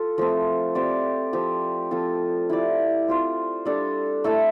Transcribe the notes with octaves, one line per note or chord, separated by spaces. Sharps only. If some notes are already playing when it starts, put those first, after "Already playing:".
Already playing: F4 A4
F3 A3 C4
C4 G4 D5
F3 C4 G4
F3 C4 F4 A4
E4 G4 D5
C4 F4 C5
G3 D4 A4
A3 E4 A4 E5